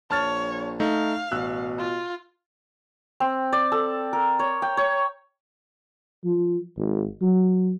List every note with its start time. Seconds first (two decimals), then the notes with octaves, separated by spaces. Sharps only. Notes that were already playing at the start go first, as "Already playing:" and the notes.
0.11 A#1 C#5 A5 F6 A6
0.80 A3 D#4 F5
1.32 A1 B2 E6 F#6
1.78 F4
3.20 C4
3.53 D5
3.72 A4
4.13 A#4
4.39 C#5
4.62 G5
4.77 C#5
6.25 F3
6.78 G#1
7.22 F#3